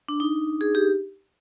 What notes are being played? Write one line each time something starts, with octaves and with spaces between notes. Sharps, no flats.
D4
D#4
G#4
G4